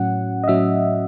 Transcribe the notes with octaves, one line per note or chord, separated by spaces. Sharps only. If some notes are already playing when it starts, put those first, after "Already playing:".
Already playing: A2 F#3 C#4 F#5
D#5
A2 F#3 C#4 E5